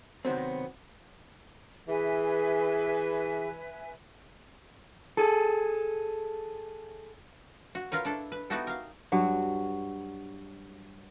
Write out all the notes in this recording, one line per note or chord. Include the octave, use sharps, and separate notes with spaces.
C3 D#3 F#3 B3 C4
E3 G#4 B4 E5 G#5
G#4 A4
F#4
F4 A#4 B4 C#5
D4 E4 A4
B4
B3 D#4 E4 F#4 G4 A4
A#4 F5
G2 F#3 F#4